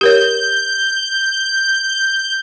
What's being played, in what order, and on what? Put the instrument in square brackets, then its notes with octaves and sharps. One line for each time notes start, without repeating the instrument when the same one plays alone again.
[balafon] G4 A#4 C#5 [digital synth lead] G6